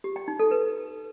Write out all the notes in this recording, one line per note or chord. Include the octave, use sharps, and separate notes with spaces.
G4
G5
D#4
A4
B4